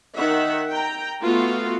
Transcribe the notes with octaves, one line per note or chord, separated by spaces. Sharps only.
D#3 E5 F#5
G5 A#5
A3 B3 F4 F#4 F5